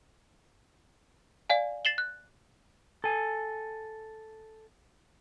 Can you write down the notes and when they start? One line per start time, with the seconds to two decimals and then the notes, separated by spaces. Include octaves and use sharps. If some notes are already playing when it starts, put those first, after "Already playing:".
1.50 D5 F5 G#5
1.85 A6 C7 E7 F#7 G7
1.98 F#6
3.04 A4 G#5